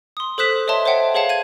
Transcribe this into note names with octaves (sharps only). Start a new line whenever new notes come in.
C6 D#6
A4 C5 D#6 F#6 B6 E7
B4 C#5 D#5 E5 A5 C6
C5 C#5 E5 F#5 G5
G#4 B4 C#5 F5 F#5 A5
G#6 D#7